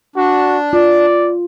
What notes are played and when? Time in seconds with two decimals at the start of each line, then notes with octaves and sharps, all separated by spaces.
0.16 D4 F#4
0.73 F4 D5